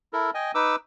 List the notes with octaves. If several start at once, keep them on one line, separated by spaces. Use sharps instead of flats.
E4 A4 A#4
D#5 G5 G#5
D#4 B4 D6 E6